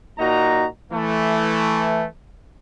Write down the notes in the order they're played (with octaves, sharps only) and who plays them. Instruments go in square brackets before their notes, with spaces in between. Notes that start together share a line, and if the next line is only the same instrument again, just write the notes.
[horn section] A#2 D#4 F#4 A#5
E3 A3